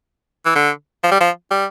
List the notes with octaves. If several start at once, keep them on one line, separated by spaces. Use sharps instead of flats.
E3
D3
F3
G3
F3
G3